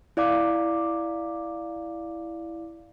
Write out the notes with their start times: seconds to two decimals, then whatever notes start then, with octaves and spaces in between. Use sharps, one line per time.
0.17 E4 D5 F5 D6